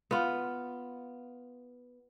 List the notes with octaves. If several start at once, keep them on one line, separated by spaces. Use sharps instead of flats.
B3 F4